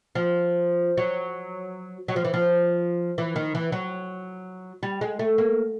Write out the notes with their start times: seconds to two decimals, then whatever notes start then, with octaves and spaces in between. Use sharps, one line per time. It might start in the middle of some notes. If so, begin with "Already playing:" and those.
0.15 F3
0.97 F#3
2.08 F#3
2.16 F3
2.25 E3
2.34 F3
3.18 E3
3.36 D#3
3.55 E3
3.72 F#3
4.83 G3
5.01 G#3
5.19 A3
5.38 A#3